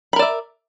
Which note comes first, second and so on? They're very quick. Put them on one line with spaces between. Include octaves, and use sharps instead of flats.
B5 A#4 D5 E5